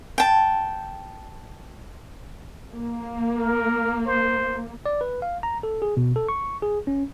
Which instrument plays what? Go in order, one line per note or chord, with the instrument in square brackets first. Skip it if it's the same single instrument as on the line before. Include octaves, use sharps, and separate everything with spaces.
[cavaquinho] G5 A5
[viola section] A#3
[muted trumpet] A#4
C5
[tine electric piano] D5
B4
F5
A#5
A4
G#4
B2
A4
C#6
G#4
C#4